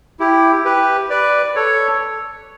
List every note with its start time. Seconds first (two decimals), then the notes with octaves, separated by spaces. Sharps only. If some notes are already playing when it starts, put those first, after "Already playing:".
0.20 E4 G4
0.65 G4 B4
1.10 B4 D5
1.56 A4 C#5